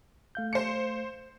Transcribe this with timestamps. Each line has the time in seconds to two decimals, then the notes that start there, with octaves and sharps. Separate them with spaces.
0.35 A3 F5 G6
0.53 C5 C#7